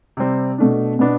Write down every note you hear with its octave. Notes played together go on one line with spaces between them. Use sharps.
C3 G3 C4
B2 A3 D4
B2 B3 D4